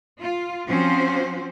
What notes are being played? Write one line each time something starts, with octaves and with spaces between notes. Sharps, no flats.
F4
F3 C4 C#4 F#4 C5